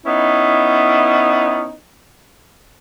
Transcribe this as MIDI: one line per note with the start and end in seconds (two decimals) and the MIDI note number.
0.06 1.72 59
0.06 1.72 61
0.06 1.72 63
0.06 1.72 64